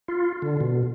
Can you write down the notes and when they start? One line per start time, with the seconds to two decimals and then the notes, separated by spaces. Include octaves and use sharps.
0.08 F4
0.42 D3
0.61 B2